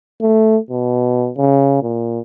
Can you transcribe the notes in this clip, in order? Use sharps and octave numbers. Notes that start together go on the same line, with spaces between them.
A3
B2
C#3
A#2